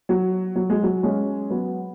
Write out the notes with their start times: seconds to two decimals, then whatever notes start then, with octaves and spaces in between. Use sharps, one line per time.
0.09 F#3
0.56 F#3
0.70 G#3
0.83 F#3
1.03 G#3 C#4
1.50 F#3 B3